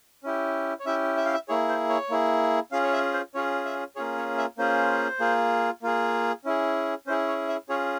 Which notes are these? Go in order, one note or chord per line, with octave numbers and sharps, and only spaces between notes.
C#4 E4 G4
C#5
C#4 E4 G4 E5
E5
F5
E5
A#3 E4 G#4 C#5
C5
C#5
A#3 E4 G#4
C#4 F4 G#4 F5
C#5
E5
C5
C#4 F4 G#4 C#5
E5
A#3 C#4 F4 G#4 C#5
C#5
E5
A#3 C#4 F4 G#4 C5
A#3 F4 G#4
A#3 F4 G#4
C#4 E4 G#4
C#4 E4 G#4 C5
C#5
E5
C#4 F4 G#4 C#5